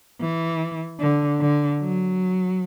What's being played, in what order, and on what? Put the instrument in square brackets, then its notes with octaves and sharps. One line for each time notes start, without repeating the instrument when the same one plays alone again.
[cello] E3
D3
D3
F#3